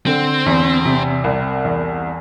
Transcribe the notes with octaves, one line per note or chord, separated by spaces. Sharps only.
D3 C4
E2
C3
C2
E2